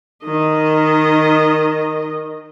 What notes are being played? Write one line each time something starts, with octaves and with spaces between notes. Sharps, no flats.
D#3 D#5